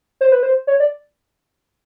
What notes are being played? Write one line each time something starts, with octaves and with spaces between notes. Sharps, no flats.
C5
B4
C5
C#5
D5